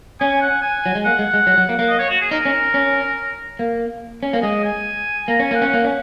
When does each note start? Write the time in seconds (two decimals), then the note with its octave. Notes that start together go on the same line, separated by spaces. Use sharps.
0.21 C#4 G#5
0.42 F#5
0.62 G#5
0.86 F#3
0.95 G#3
1.05 A#3 F#5
1.19 G#3
1.34 G#3
1.47 F#3
1.58 F#3
1.69 A#3
1.79 A#3
1.90 D#5
2.00 C#5
2.10 F#4
2.21 G#4
2.31 D#4 A#4
2.45 C#4
2.74 C#4
3.59 A#3
4.23 C#4
4.33 A#3
4.43 G#3 D#5
4.64 G#5
5.28 A#3 A#5
5.40 C#4 G#5
5.51 A#3 F#5
5.62 C#4
5.74 A#3
5.85 C#4